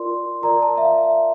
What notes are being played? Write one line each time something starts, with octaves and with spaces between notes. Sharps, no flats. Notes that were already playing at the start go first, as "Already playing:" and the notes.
Already playing: F4 A#4 D5 C6
F4 A#4 D5 A#5
A5
E5
F5
E5